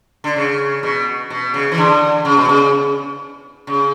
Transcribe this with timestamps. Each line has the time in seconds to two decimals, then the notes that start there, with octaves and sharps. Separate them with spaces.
0.24 D3
0.36 C#3
0.83 B2
1.30 B2
1.54 C#3
1.72 E3
1.78 D3
2.25 C#3
2.37 B2
2.49 C#3
3.67 C#3